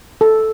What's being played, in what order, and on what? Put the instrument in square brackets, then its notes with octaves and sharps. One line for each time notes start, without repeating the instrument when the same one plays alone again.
[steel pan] A4